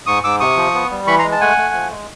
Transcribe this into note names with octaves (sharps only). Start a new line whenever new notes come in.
G#2 C#6 D#6
G#2 D6 E6
C3 C#6 D#6
F3
B3
G3
E3 B5 C#6
A#5 C6
G#3
A5
A3 F#5 G#5
A3
F3
G#3